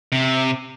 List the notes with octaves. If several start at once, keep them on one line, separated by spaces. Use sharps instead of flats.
C3